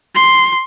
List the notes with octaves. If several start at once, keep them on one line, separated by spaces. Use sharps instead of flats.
C6